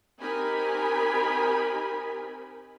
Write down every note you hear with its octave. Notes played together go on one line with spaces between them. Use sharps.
C4 D#4 G4 A#4 G#5 B5